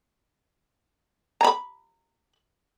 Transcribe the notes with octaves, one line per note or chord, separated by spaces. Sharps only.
A#5 B5